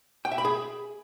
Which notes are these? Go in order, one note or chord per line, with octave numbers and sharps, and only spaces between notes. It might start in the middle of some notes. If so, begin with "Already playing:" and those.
G5
E5
B5
G#4